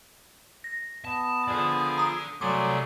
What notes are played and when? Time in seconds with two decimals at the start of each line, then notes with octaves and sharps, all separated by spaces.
0.64 A#6
1.05 B3 A5
1.48 F3 G#4 A4 D5 F5
1.98 A#5 D#6
2.41 C2 F#3 A3 G#4 D5 C6 D6